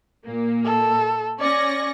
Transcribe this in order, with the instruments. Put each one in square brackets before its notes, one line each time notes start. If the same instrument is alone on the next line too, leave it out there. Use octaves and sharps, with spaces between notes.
[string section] A#2 A#3
[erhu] A4
[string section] C#4 C#6 A#6 [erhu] D5